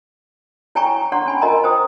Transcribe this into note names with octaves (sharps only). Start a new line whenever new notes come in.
E4 C#5 G5 G#5 A#5 C#6
D4 C#5 F#5 C6 C#6
C#4 G#5 B5
F4 A#4 D#5 G#5 A#5 C6
C5 G5 D#6